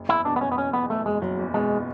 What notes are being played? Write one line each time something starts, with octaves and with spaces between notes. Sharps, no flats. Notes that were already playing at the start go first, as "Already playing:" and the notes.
Already playing: F#1
E2 E4
B2 D4
B3
F#1 C#4
B3
F#1 C#4
E2 B3
B2 A3
F#1 G#3
F#1 F#3
E2
B2 G#3